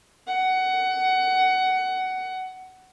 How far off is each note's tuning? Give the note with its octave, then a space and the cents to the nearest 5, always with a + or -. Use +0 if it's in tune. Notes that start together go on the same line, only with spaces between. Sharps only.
F#5 +20